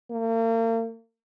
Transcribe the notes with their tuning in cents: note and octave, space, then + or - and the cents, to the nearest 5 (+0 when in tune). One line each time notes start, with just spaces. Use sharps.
A#3 -40